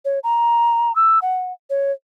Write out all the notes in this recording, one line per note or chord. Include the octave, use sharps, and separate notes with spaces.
C#5
A#5
E6
F#5
C#5